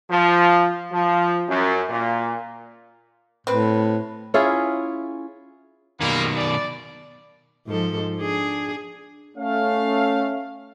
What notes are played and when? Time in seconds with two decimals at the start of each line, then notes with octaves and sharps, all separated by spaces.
0.11 F3
0.93 F3
1.49 F#2
1.90 A#2
3.47 A2 C4 B4
4.34 C#4 E4 F4 G#4
6.01 B2 D#3 G3 G#3 A#3
6.37 D5
7.67 G#2 F3 A4
8.17 D4 G#4
9.37 A3 C#4 F5